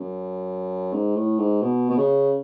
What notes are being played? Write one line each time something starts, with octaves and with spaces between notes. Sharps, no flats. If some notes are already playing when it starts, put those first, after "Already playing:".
Already playing: F#2
G#2
A2
G#2
B2
B2
C#3